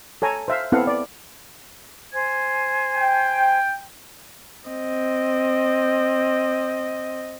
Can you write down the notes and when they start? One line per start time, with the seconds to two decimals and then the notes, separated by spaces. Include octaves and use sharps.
0.22 A4 C#5 G#5 A#5
0.48 C5 E5 F5
0.72 B3 C4 E4 A4 F5 F#5
0.87 D5
2.13 C5 G#5 G#6
2.96 G5
4.68 C4 D#5